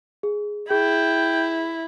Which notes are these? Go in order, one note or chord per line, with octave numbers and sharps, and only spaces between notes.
G#4
E4 G#4 G5